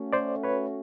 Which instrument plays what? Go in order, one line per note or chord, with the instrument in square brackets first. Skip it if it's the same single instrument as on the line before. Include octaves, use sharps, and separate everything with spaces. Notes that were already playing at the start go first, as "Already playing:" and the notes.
Already playing: [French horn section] A3 C#4 F#4
[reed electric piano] C5 D5
B4 C#5